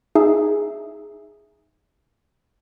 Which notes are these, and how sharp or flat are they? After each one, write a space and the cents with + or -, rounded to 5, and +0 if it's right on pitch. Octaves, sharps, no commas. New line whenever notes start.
D#4 +0 G#4 +0 E5 +0